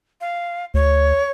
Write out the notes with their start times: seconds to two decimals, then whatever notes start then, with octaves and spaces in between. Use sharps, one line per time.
0.21 F5
0.74 D2 C#5